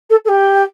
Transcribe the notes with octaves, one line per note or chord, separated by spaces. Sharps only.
A4
A4
G4